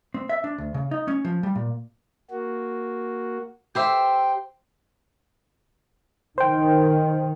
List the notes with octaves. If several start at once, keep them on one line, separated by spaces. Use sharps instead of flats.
C4
E5
D4
D2
C#3
D#4
C#4
F3
G3
A#2
A#3 F#4
G4 C5 E5 G5
D#3 C5 G5